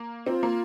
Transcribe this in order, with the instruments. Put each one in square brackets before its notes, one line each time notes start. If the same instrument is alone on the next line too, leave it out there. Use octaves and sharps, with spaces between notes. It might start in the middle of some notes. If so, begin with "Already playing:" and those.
Already playing: [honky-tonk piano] A#3
[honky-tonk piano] C4 [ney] F4
[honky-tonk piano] A#3